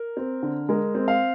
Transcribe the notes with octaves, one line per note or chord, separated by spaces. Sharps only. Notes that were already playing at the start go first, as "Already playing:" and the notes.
Already playing: A#4
C4
D3
G#3 A#4
C4
F5